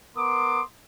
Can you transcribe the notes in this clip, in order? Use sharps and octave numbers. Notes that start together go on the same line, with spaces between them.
B3 A#4 C6 D6 D#6